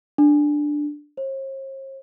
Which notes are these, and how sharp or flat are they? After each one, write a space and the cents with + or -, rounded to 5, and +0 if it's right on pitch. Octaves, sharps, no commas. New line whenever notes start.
D4 +5
C5 +45